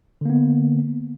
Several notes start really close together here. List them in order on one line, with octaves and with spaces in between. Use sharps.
D3 A#3 B3